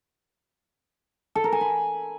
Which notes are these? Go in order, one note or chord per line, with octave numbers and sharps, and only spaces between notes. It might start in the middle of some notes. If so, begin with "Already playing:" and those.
A4
A#4
G#5
B5